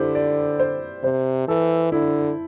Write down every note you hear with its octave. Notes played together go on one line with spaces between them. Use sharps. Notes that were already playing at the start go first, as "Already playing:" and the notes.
Already playing: D3 E4 G4 C5
D5
C5
C3 C5
E3 A4
D3 E4